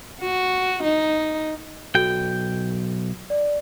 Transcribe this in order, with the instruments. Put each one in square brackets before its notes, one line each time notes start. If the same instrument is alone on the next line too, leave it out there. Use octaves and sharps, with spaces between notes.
[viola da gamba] F#4
D#4
[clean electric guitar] B1 G5 [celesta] F#4 A4
[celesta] D5